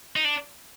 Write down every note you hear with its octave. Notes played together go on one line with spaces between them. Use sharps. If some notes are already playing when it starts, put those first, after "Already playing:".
D#4
D4